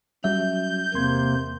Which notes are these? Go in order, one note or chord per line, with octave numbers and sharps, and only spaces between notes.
F#3 G3 C#4 F#4 E5 G6
E2 C3 A#3 C6 G#6